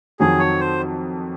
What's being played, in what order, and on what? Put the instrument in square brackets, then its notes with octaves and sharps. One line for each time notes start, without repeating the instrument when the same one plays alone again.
[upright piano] F2 D#3 F#3 [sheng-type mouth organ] G#4
[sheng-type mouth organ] C#5
C5